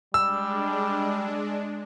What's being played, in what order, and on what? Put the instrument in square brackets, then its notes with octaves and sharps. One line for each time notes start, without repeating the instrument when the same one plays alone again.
[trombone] G3 [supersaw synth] G#3 D4 [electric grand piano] E6